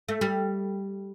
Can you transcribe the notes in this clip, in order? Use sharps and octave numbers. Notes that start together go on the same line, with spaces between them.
A3
G3